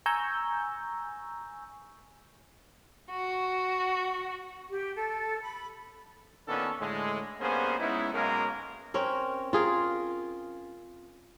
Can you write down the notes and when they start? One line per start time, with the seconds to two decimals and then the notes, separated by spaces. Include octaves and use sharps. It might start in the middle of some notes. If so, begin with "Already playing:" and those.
0.06 G#5 A#5 C#6 E6 G6
3.08 F#4
4.70 G4
4.95 A4
5.42 B5
6.47 A#2 D#3 B3 C#4 D4 A4
6.80 A2 D3 G#3
7.40 G2 A#3 B3 C#4 G#4 C5
7.79 G#3 B3 C#4 D#4 E4
8.13 B1 B2 G#3 A#3 C#4 A#4
8.94 C4 C#4 A#4
9.53 F4 G#4 A#4